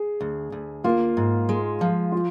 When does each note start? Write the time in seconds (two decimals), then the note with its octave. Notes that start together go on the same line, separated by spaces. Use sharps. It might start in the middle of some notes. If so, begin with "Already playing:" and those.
Already playing: G#4
0.21 D2
0.52 D2
0.84 A#3 F4
1.17 G#2
1.49 G#3
1.81 F3
2.12 F4